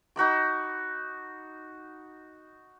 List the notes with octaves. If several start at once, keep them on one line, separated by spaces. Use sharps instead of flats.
D#4 F#4 B5 D6